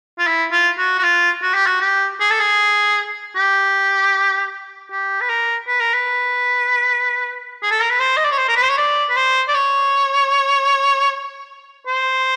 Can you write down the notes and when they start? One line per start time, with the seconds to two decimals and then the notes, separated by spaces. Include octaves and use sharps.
0.19 F4
0.27 E4
0.52 F4
0.78 F#4
0.99 F#4
1.03 F4
1.42 F#4
1.55 G4
1.66 F#4
1.81 G4
2.20 G#4
2.30 A4
2.40 G#4
3.36 G4
4.91 G4
5.21 B4
5.29 A#4
5.67 B4
5.80 A#4
5.94 B4
7.63 G#4
7.71 A4
7.81 A#4
7.90 B4
8.00 C5
8.17 D#5
8.25 D5
8.32 C#5
8.38 C5
8.48 A#4
8.56 B4
8.62 C5
8.70 C#5
8.78 D5
9.10 B4
9.16 C5
9.48 D5
9.54 C#5
11.87 C5